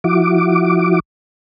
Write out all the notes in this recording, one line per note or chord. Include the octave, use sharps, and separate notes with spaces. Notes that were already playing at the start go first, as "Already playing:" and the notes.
F3 E4 F#4 D6